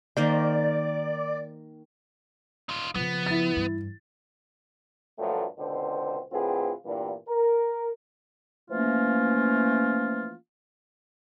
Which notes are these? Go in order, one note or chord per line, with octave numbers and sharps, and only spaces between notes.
D#3 A#3 C5 D5
D#4 F4
C#3 F3 B3
E4 A6
G2 E3
G2 A#2 F3 F#3 A3
C#2 B2 D3 C4 C5
A2 D3 C4 F4 G#4 B4
E2 G2 A#2
A#4
E3 F3 A3 A#3 C#4 F4